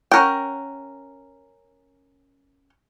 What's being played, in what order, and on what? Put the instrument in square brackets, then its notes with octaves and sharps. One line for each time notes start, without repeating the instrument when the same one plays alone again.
[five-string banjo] C#4 A#4 F#5 G5